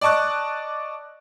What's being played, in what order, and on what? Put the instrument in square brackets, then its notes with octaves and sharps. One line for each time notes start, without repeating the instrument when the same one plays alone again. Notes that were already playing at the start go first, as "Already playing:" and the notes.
[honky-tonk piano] D5 D#5 A5 C#6 F#6